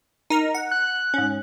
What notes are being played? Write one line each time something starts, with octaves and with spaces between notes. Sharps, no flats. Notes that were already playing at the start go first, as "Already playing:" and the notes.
D#4 A#4 A#5
F#5
F#6
G#2 C#4